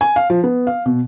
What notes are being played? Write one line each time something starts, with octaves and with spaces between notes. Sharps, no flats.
G#5
F5
F3
B3
F5
B2